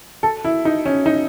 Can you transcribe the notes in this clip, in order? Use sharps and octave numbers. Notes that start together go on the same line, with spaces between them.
A4
E4
D#4
C#4
D#4